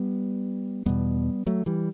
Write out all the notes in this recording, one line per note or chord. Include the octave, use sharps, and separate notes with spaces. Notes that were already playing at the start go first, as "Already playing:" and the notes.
Already playing: G3 B3
E2 B2 G3 B3
F#3 A3
E3 G3